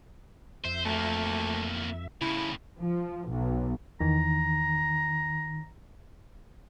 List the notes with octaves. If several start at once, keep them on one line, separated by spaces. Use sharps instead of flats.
F2 C5 E5
E2 A3 A#3
A2 C#3 E4
F3
B1
E2 D#3 E3 A#5